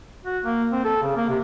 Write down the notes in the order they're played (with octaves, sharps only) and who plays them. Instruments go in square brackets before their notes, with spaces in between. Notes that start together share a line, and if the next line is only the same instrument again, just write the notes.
[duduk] F#4
A#3
C4
A4
C#3
A#3
C3